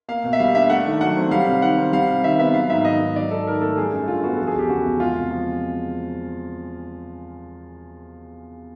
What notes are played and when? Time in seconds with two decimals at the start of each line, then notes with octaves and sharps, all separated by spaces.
0.08 A#3 F5
0.24 B2
0.33 E5
0.39 G3 F5
0.55 D4 E5
0.70 A3 F#5
0.86 D#3
1.01 F#3 F#5
1.17 C4
1.31 G3 F5
1.47 C3
1.62 D#3 F#5
1.78 C4
1.93 G3 F5
2.09 C3
2.23 D#3 E5
2.38 B3 E5
2.54 F#3 F5
2.70 G#2 E5
2.85 D#3 D#5
3.00 G#2
3.16 F#3 D5
3.31 G#2 A4
3.47 D#3 A#4
3.61 A3 A4
3.77 G3 G#4
3.92 F#2
4.08 D3 F4
4.23 B3 F#4
4.36 F3 A4
4.47 G#4
4.55 E2 G4
4.69 C#3 F#4
4.85 E2
5.00 G#3 F4
5.15 C3
5.30 F3